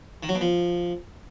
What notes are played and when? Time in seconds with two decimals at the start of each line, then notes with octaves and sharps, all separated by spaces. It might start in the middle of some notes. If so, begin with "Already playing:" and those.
0.23 D#3
0.29 F#3
0.35 B2
0.41 F3